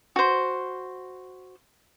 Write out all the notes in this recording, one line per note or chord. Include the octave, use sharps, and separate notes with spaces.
F#4 C5